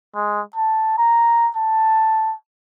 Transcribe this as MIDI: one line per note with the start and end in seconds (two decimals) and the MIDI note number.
0.15 0.41 56
0.56 0.96 81
0.98 1.50 82
1.56 2.35 81